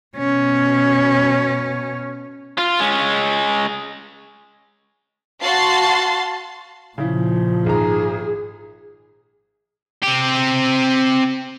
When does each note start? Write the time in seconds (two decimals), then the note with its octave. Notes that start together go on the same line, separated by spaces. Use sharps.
0.17 B2 C#4
2.58 F4
2.80 G#3 C#4
5.43 F#4 F5 A5 C6 A6 C7
6.98 A#2 C#3 F3 E4
7.66 G#1 G#4 A#5
10.03 C4 G4